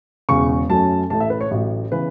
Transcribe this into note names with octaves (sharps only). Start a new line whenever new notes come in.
E1 E2 C#3 C#6
F#2 F#3 A3 C#4 A5
A1 A2 A3 A5
E5
B4
C#5
A1 A2 F#3
C#3 E3 B3 B4